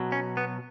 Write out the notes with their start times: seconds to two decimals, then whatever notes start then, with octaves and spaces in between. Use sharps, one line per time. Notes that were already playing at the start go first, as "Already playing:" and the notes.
Already playing: B2 F#3
0.12 C#4
0.37 B3